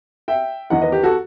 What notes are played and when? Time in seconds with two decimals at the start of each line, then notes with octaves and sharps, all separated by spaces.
0.28 E5 G5
0.70 E2 D#3 D#5 F#5
0.82 B4 D#5
0.92 G4 B4
1.04 F#4 A4